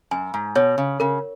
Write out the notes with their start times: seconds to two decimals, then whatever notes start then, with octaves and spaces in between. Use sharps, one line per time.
0.11 F#2 G#5
0.34 G#2
0.55 B2 C#5
0.78 C#3
1.00 C#3 A#4